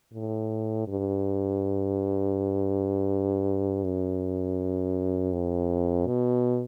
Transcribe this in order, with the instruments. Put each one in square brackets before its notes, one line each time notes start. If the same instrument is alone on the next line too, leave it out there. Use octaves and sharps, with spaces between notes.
[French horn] A2
G2
F#2
F2
B2